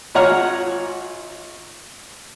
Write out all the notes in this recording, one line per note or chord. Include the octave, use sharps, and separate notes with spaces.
G#1 F4 C#5 F#5 A#5 F6